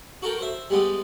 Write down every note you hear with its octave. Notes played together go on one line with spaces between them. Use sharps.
F#4 A4 A#4 G5
C5 E5
G3 G#3 B3 G4